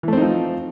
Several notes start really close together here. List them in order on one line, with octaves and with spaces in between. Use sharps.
E3 A3 C4 D#4 F3